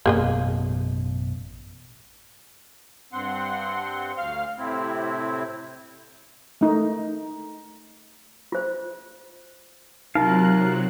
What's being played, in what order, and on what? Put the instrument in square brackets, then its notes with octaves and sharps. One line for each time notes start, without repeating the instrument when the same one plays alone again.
[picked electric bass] A1 F#2 B2 [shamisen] A#3 G#4 D#5
[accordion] G2 C4 F#5 C6
D2 F5 F6
A2 C3 C4 E4
[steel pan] A3 D#4
[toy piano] F4 C5
[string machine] C3 F#3 F#6 [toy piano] D#4 [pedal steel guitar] F4 A#4 F5